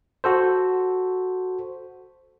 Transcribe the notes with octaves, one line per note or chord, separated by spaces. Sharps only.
F#4 A4 C5